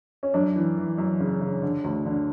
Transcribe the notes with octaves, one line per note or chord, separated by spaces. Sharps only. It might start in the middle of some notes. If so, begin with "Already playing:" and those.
C#4
F#2 D4
E3
E3
F#2
C#3
C#3
D3
D2
D3